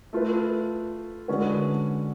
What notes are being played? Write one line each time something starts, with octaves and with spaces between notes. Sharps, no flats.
A3 F4 B4
D3 G#3 C#4 F#4 B4